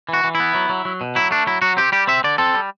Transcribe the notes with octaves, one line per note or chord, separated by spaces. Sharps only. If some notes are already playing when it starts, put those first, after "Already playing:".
E3 F#4
E3
E4
B3
F#3
F#3
F#3
B2
F#3 E4
A3 D4
F#3 E4
F#3 F#4
C4 G4
G3 G4
C4 E5
D3 D5
C4 A4
G3